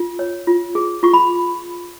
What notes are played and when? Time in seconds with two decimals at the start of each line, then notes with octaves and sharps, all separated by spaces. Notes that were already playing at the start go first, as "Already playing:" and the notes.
Already playing: F4
0.19 C#5
0.47 F4
0.75 G#4
1.03 F4 C#6
1.13 B5